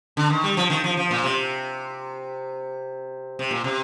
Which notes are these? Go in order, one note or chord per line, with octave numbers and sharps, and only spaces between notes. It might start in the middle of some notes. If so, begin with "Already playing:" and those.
D3
D#3
G3
F3
D#3
F3
F3
A#2
C3
C3
A#2
C3